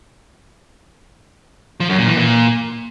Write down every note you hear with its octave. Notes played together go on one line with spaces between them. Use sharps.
F3
F#2
A#2
E3
A#2